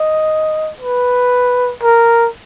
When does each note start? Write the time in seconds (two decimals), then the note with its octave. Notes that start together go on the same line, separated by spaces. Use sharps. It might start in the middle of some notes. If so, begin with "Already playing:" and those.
Already playing: D#5
0.81 B4
1.83 A#4